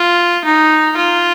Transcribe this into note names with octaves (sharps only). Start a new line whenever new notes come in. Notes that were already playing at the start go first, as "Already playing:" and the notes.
Already playing: F4
D#4
F4